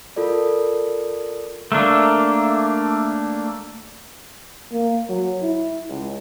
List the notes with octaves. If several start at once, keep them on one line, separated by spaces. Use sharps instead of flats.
F4 A4 A#4 D5
A3 A#3 D4
A#3
F#3
E4
C#2